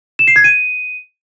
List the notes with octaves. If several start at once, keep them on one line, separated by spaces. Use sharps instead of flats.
E7
C7
G#6
D#7